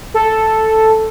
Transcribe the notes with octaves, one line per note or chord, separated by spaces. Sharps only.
A4